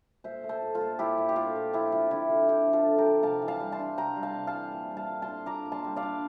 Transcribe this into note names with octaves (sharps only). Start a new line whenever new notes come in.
A#2 C5 E5
A3
A4 C5
A#2
F4 A4
A#2
A#2 E4 G4
A#2
G4
A3 F4
A#2
F3 E4 G4
C4 F4
D3 E4
F3 F4
D3 E4 G4
F3
F4 A4
D3
G4 A#4
F3
C3 F5 A5
E3
F5 A5
G3
A5 C6
D4
C3 G5 A#5
G3
F5 A5
C3
F5 A5
E3
A#2
G3
F5 A5
A#2
A5 C6
D4
A#2 A#5 D6
A#2
A5 C6
G3
D5 F5
D4